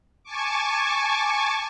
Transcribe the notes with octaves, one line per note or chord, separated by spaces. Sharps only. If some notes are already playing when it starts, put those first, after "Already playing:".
G#5 A5 C#6 D6